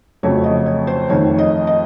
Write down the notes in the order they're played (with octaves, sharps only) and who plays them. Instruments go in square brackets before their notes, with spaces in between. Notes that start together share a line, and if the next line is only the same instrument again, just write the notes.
[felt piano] F2 C#3 F#3 A3 C#5
D#5
C#5
C5
F2 D#3 A3 C#5
D#5
D#5